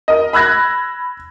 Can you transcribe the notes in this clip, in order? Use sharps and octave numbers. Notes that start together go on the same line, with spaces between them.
A#4 D#5
B5 E6 F#6 G#6 A#6